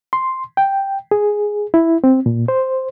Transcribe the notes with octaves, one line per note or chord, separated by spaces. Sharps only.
C6
G5
G#4
E4
C4
A#2
C5